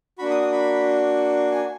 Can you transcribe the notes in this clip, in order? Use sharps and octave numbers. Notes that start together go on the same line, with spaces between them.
A#3 D4 F#4 B5
D#6
D#6
B5
G#5